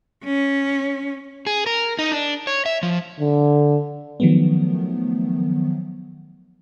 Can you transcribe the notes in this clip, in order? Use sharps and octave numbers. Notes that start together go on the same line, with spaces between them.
C#4
G#4
A#4
D#4
D4
C#5
E5
F3
D3
D#3 F3 F#3 A3 B3